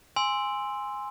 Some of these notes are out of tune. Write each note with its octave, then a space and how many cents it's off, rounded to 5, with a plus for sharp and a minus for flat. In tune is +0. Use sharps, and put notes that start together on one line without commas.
G#5 -10 C6 +0 E6 +0